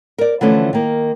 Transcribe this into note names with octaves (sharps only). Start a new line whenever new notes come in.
A#4 D5
D3 E3 F3 A3 C#4
D#3 A#3